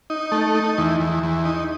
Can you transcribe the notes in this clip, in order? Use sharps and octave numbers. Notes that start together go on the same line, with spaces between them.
D#4
A3
D#4
E2
E2
E2
D#4